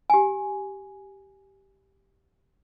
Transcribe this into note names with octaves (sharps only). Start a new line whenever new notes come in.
G4 G#5